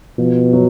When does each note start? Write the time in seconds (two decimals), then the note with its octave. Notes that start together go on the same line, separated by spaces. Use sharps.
0.18 B2 F3
0.53 F#3